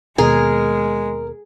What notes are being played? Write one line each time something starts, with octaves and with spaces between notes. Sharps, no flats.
D#2 B2 G#3 G#4 A#4